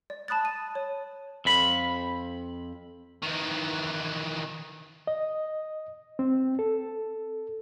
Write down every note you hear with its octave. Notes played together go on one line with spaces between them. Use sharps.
D5
A5 B5 D#6 F#6 A6
D#7
C#5
F2 B5
D#3 E3
D#5
C4
A4